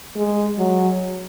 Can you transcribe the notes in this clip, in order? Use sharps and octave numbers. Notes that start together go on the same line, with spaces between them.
G#3
F#3